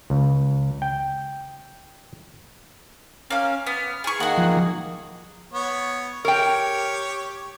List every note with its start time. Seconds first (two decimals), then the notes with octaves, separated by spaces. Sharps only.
0.10 C#2
0.82 G5
3.30 A#3 C#4 F5
3.67 B3 F6
4.04 G#4 C#6
4.20 D#3 A#3 F#4 G#4 F#5
4.38 F3
5.53 B3 C#5
6.25 G4 A#4 C#5 G5